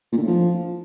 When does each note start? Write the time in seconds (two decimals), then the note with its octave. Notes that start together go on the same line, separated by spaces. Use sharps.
0.12 A#2
0.17 D3
0.22 A2
0.27 F3